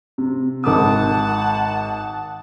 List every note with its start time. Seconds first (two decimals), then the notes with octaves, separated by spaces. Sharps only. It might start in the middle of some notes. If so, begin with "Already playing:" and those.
0.18 C3
0.64 G#1 F#5 A5 D6 D#6